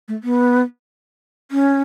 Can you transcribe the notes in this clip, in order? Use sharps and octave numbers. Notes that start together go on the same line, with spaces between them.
A3
B3
C#4